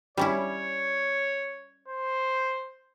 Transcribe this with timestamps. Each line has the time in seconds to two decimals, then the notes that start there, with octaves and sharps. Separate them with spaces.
0.17 G3 C#4 E4 C#5
1.88 C5